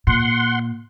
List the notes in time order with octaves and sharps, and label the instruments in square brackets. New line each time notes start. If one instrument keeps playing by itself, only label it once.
[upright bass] A#2 [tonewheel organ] F#5 C6